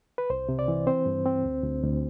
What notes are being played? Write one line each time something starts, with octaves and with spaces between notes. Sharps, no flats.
B4
C2 C5
C3
D5
E3
C4 C5
G2
C4
D2
D2
D2